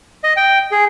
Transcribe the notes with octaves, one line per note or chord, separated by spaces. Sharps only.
D#5
G5
G#4